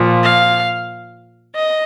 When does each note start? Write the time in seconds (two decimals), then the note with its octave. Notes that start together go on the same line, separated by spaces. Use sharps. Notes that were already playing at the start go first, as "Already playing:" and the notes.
Already playing: A#2 F3
0.24 F5
1.56 D#5